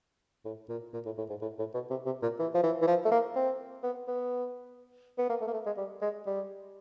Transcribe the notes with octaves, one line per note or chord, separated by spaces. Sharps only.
A2
A#2
A#2
A2
A2
G#2
A2
A2
B2
C3
C3
A#2
E3
F3
E3
E3
F3
A3
A#3
C4
B3
B3
B3
A#3
A3
A#3
A3
G#3
G3
G#3
G3